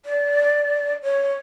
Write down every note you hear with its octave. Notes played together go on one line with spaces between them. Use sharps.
D5
C#5